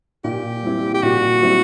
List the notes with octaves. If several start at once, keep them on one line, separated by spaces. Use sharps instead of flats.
A#2 G4
G3 C4 E4
G4
A#2 F#4
G3 C4 E4